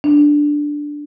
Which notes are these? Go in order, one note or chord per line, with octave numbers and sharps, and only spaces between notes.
D4